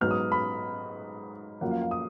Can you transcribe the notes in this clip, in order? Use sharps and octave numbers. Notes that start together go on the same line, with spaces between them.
G#2 F#3 B3 F6
D#6
B5
F#2 F3 A#3 F#5
F5
F5
D#6